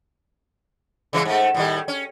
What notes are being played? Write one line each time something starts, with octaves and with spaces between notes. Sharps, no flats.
C#3 E3 G#3
G#2 A3
A2 D#3 G3
C#4